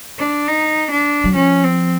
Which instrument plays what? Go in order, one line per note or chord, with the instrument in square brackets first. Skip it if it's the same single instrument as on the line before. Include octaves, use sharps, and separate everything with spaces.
[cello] D4
D#4
D4
[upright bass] F#3
[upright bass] F3 [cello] C#4
[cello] C4